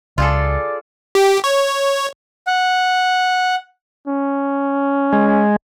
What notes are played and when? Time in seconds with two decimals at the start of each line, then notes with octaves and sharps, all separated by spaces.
0.18 C#2 F4 G#4 A4 D5
1.15 G4
1.44 C#5
2.47 F#5
4.08 C#4
5.13 G#3